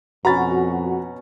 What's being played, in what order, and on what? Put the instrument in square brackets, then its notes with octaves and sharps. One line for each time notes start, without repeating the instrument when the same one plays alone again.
[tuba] F2 [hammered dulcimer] B2 C#4 [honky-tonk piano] F#4 [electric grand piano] A#5 B5 A6